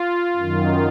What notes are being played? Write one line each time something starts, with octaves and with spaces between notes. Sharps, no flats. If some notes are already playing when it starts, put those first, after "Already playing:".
Already playing: F4
F#2 D#3